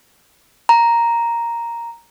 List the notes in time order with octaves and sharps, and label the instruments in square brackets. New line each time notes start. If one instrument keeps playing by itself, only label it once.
[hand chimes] A#5